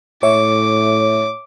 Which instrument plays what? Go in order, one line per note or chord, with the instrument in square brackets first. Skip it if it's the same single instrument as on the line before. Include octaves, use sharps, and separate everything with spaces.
[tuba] A2 [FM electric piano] C#5 E5 [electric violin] D6